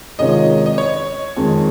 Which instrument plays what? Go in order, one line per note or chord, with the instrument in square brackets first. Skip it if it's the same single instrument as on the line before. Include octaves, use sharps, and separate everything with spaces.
[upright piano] C3 D#3 G#3 C#4 F4 [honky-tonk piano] D#5
[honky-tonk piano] D#5
C#5
[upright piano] F2 D#3 G#3